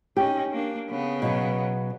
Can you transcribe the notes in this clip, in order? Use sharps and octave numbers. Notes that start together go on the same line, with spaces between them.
C#4 D#4 G4
A#3 D4
C#3 B3
B2 F#3